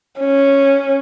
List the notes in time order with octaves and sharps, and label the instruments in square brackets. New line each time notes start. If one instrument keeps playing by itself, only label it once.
[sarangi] C#4